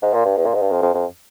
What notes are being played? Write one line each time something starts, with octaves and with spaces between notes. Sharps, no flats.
G#2
A#2
G2
E2
A#2
G#2
G2
F2
F2
F2